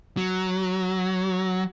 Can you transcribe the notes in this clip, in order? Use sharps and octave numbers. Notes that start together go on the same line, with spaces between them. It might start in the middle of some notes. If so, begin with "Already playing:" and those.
F#3